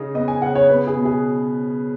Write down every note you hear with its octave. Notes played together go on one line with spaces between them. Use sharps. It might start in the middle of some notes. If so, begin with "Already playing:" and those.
Already playing: C#3 D#4
B3 D#5
G#5
C#3 F#5
C#5
B3 B4
G#4
B2
G#4